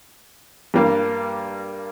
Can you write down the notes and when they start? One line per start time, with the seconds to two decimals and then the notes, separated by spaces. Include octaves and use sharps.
0.74 G2 G3 A#3